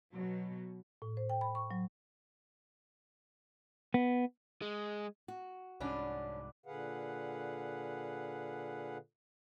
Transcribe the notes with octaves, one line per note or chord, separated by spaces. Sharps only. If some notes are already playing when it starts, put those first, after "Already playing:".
B2 F#3
A2
C5
G5
B5
C#6
F#3
B3
G#3
F#4
C2 G#2 C#4 D4 B4 D5 F#5
A#2 D3 G#4 B4 F5 F#5